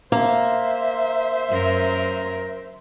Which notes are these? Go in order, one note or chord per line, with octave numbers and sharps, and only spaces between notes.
A#3 C5 E5
F#2 A#4